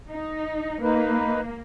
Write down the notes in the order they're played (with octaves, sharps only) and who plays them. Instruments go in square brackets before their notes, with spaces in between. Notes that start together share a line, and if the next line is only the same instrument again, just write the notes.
[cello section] D#4
[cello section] A#3 [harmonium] D#4 B4